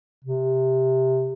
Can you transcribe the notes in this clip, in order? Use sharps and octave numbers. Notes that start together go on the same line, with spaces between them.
C3